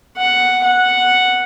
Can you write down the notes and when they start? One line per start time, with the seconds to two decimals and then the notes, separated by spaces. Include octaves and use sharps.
0.18 F#5
0.64 F#5